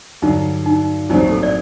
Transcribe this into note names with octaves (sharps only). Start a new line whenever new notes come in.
G2 D3 F#3 D#4
D#4
A#1 A2 F#3 C4 D#4
G4
A4
D5